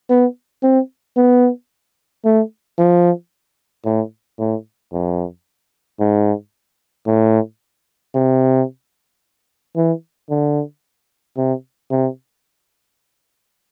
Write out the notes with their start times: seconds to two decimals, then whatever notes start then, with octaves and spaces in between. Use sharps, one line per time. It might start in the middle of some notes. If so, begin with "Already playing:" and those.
0.10 B3
0.63 C4
1.17 B3
2.25 A3
2.78 F3
3.85 A2
4.39 A2
4.92 F2
6.00 G#2
7.07 A2
8.15 C3
9.76 E3
10.30 D3
11.37 C3
11.91 C3